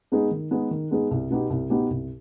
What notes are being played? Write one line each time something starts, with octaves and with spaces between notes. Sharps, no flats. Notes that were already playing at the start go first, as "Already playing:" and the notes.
G#3 B3 D#4 G#4
D#3
G#3 B3 D#4 G#4
D#3
G#3 B3 D#4 G#4
C2
B2 B3 D#4 G4
C2
B2 B3 D#4 G4
C2